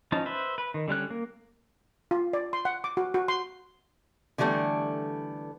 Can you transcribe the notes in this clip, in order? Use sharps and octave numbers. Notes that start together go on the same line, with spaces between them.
F3 C#4 D#4 A5
B4 C5 E5
B4
D#3
D3 G3 C#4 F#6
A#3
F4
D5
C6
F#5
D6
F#4
F#4
C6
D3 E3 G3 A3 B3